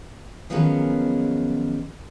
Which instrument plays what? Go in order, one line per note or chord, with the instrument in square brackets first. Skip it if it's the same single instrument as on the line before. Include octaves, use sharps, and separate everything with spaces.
[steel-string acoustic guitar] D#3 F3 F#3 B3 C#4 G#4